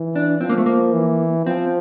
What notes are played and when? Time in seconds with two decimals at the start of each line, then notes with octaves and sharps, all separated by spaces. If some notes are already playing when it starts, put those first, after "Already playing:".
Already playing: E3
0.16 D4
0.41 F3 C4
0.50 A#3
0.58 A3
0.66 A#3
0.93 E3
1.46 F3 C4